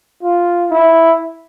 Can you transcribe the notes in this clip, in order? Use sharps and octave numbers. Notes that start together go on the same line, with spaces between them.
F4
E4